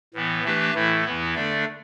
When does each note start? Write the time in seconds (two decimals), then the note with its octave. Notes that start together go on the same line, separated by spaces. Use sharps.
0.14 A2 E3 B3
0.44 E3 A3 D4 G4 B4
0.74 A2 E3 A3 E4 A4
1.05 E2 E3 B3 E4
1.35 D3 A3 D4 A4 D5